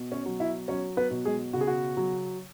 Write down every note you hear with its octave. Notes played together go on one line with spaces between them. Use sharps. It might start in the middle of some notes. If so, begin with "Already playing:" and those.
Already playing: B2
C#4 C#5
F#3
E4 E5
F#3 C#4 C#5
B3 B4
B2
G#3 G#4
C#3 F#4
G#4
F#4
F#3